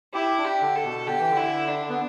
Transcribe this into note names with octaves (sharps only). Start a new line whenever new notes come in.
E4 G4
D4
G4
D3
A4
B2
D3 G4
E3
D3
E4
D4
B3